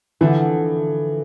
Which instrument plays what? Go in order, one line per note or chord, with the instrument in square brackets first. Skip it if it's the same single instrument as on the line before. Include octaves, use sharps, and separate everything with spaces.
[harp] D3 F3 B3 F4 A4 [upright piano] E3